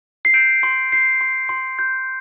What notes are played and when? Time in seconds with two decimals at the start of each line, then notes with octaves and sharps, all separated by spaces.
0.25 C7
0.34 G6 D7
0.63 C6
0.92 G6 C7
1.21 C6
1.49 C6
1.79 G6